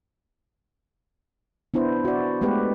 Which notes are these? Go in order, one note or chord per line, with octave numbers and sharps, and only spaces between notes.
B3 D4 E4 C5
F#4 D5
G#3 A3 B3 G4 B4